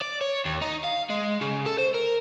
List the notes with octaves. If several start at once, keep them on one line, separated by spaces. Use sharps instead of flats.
D5
C#5
D#2
D#4
F5
G#3
C#3
A4
C5
A#4